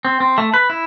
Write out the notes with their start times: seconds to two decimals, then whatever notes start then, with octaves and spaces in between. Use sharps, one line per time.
0.05 C4
0.20 C4
0.38 A3
0.54 B4
0.70 E4